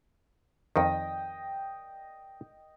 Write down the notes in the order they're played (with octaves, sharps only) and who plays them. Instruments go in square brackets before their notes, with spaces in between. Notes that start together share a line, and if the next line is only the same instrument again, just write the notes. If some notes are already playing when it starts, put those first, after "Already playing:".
[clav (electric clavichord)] F2 D#3 [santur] D#5 G5